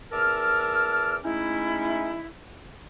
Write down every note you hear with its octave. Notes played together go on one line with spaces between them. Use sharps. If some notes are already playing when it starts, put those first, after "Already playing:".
E2 A#4 A5 D6 E6 F6
G#3 A3 C#4 D#4 E4